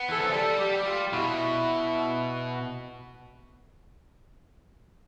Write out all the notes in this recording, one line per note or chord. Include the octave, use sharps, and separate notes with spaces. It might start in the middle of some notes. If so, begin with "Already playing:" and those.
Already playing: B3
E3 A4
F3
G3 A4
G4
F4
B2 E4